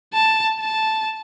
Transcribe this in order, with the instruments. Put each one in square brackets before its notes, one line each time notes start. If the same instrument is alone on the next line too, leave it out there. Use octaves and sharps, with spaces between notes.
[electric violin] A5
A5